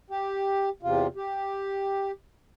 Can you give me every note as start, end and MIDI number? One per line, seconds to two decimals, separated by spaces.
0.10 0.69 67
0.83 1.07 40
0.83 1.07 48
0.83 1.07 65
1.16 2.11 67